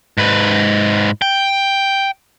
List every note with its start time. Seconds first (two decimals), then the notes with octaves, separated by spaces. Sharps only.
0.18 G#2 B4
1.22 G5